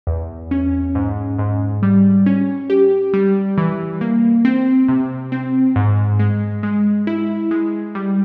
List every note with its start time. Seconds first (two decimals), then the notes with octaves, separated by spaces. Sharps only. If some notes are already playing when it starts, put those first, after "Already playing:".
0.07 E2
0.51 C#4
0.95 G#2
1.39 G#2
1.82 G3
2.26 C#4
2.70 G4
3.13 G3
3.58 E3
4.01 A#3
4.45 C4
4.88 C3
5.32 C4
5.76 G#2
6.20 G#3
6.63 G#3
7.07 E4
7.51 G#3
7.95 G3